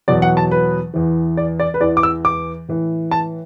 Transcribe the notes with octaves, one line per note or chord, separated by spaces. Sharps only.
E2 B2 F#3 D5
F#5
A5
B4
E2 E3
D5
D5
B4
E2 E3 D5
D6
E6
D6
A2 E3
A5